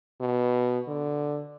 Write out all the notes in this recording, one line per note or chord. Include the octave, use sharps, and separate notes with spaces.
B2
D3